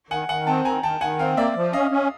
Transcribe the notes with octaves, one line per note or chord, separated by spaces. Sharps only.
D#3 F#5 G#5
D#3 F#5 G#5
C4 G5 A5
D#3 G#5 A#5
D#3 G5 A5
D#3 F#5 G#5
C4 F5 G5
A#3 D5 E5
F3
C#4 D#5 F5
C#4